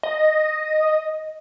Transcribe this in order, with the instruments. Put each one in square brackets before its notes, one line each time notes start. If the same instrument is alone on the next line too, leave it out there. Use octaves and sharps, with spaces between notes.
[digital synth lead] D#5